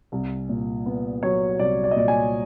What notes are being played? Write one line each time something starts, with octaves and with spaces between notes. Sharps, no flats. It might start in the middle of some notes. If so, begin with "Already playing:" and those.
C2
A#2
B3
F#3 C#5
C2 D5
D5
D#5
A#2 D5
G#5